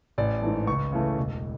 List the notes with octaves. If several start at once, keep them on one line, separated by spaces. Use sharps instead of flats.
A1 D5
G#2 E3 A3
C#2 C#6
C#3 E3 A3
E1